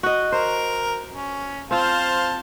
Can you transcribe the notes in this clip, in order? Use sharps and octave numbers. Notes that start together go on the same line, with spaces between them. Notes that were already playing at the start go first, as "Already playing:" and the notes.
F#4 D#5
A#4 C5
C#4
C4 F4 C5 F5 A5